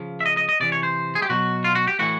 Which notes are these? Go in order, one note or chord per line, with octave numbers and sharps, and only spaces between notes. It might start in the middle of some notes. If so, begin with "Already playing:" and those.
Already playing: C#3 F3
E5
D#5
D#5
D#5
C3 E3 D5
C#5
C5
G#4
G4
B2 F#3 F#4
F4
F#4
G4
A2 E3 F#4